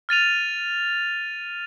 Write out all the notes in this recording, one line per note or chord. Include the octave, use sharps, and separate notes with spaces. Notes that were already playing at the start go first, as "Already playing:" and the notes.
F6 A6 D#7 F7